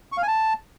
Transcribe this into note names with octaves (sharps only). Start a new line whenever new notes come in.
C#6
F5
G#5
A5